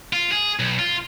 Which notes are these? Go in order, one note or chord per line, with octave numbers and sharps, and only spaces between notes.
F4
G#4
B1
F4